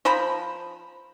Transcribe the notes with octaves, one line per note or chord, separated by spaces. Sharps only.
F3 C5 A#5 B5